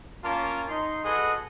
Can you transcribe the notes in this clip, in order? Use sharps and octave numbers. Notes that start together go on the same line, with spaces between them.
A#3 C#4 F4 A#4 A5 D6
D#4 C6
F#4 G#4 A4 B4 D#5 F#5